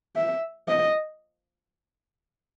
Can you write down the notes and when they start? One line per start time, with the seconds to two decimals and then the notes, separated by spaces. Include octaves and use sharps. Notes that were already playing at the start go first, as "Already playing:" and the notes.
0.16 E5
0.68 D#5